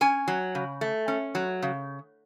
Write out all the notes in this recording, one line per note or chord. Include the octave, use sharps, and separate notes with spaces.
C#4 G#5
F#3
C#3
A3
C#4
F#3
C#3